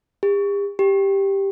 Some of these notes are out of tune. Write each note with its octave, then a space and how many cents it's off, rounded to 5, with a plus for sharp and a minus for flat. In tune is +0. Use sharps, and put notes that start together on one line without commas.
G4 +45
G4 +5